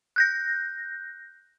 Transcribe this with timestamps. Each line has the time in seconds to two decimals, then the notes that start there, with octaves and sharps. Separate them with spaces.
0.16 F#6 G6 A#6